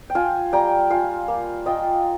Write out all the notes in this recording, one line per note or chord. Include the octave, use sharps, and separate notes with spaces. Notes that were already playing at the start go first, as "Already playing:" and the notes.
G5
F4 F5 G#5
G3 G5 A#5
F4 F5 G#5
A#3
F4 D#5 G5